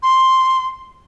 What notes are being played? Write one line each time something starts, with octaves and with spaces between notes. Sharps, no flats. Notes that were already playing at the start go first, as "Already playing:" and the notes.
C6